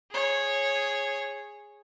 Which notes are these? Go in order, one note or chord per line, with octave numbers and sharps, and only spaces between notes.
G#4 C#5